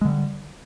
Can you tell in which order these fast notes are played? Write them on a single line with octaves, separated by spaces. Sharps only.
G#3 D3 G3